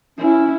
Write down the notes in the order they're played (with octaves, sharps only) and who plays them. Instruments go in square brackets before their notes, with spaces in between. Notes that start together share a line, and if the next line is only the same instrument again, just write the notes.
[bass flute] C#4 [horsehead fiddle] E4